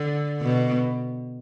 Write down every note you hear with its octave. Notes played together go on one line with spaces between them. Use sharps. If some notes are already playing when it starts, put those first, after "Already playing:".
Already playing: D3
B2